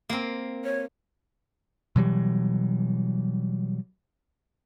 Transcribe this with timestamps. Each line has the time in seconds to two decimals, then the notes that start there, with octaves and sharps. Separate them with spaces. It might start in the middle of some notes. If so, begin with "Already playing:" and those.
0.09 A#3 C4
0.64 C#5
1.96 B2 E3 F#3 G3